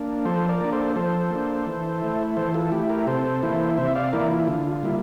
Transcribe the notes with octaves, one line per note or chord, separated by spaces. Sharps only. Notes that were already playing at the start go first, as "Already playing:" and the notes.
Already playing: A#3 D4
F3 A4 C5
A#4 D5
A#3 D4
A4 C5
F3 A4 C5
A#3 D4
E3
A3 E4
E3 A4 C5
F4 A4
A3 E4 G4
G4 A#4
C3 A4 C5
E3 A#3 E4
C3 C5 E5
D5 F5
E3 A#3 E4 A#4 D5
F4
D3 F4
F4
G3 A#3 E4